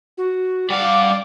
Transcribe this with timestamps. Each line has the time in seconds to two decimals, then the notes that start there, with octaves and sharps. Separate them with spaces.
0.18 F#4
0.70 G3 D5 F5 F#5